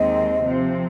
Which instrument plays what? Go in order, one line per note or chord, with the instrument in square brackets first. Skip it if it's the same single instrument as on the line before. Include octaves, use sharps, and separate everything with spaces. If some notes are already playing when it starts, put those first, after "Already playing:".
Already playing: [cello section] D#2 D#3 G#3 C4 [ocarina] D#5
[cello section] C3 F3 C4